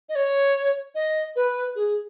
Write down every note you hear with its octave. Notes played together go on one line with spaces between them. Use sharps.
D#5
C#5
D#5
B4
G#4